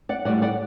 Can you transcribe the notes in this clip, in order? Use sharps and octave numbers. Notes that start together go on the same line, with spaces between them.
D5 F#5
A2 G3 D5 F#5
D5 F#5